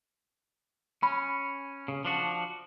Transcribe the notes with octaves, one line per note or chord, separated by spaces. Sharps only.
C#4 B5
C#3
F3 D4 F#4